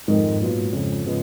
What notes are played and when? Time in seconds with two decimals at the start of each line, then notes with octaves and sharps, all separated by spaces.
0.08 F2 G#2 D#3 G#3 D#4 A#4
0.40 A#2 F#3 B3 F4
0.73 F2 C#3 F3
1.06 C#3 F3 G#3 B3